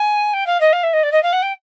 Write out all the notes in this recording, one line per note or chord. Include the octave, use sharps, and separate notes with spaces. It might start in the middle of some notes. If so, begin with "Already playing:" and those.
Already playing: G#5
G5
F5
D#5
F5
E5
D#5
D5
D#5
F5
F#5
G5